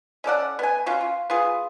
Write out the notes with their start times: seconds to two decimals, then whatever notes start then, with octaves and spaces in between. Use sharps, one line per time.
0.24 C#4 A4 D5 F#5
0.59 B3 G#5
0.86 C#4 F4 F#4
1.01 F4
1.30 B3 F4 G#4